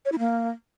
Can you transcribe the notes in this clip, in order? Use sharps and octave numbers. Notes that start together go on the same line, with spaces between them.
C#5
E4
A#3